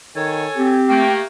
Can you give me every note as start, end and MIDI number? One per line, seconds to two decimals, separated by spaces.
0.16 0.46 51
0.16 0.78 69
0.16 0.78 73
0.16 0.78 80
0.57 1.04 60
0.57 1.25 67
0.89 1.24 57
0.89 1.24 58
0.89 1.12 79